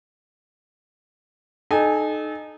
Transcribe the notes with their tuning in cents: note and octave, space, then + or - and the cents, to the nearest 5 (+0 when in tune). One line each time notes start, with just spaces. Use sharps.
D#4 -20 A4 -35 G#5 -20